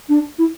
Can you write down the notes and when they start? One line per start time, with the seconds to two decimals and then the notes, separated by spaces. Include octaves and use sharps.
0.09 D4
0.38 E4